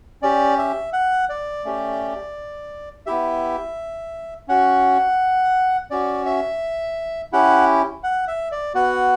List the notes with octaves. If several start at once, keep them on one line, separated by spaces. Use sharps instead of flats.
C#4 G4 D5
E5
F#5
D5
A3 C#4 G4
B3 E4 G4 E5
C#4 F#4 F#5
C#4 F#4 D5
E5
C#4 E4 G4 F#5
F#5
E5
D5
B3 F#4 F#5